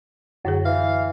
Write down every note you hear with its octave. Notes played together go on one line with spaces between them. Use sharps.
F#2 D3 F#3 G#4
E3 F5